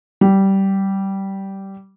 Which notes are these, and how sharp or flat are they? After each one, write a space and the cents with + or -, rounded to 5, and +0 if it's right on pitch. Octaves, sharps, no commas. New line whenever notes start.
G3 -15